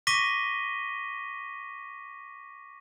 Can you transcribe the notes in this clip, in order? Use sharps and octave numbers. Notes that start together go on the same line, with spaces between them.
C#6 D6 A#6 B6 D#7 G7